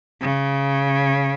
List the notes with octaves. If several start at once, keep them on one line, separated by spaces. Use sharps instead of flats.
C#3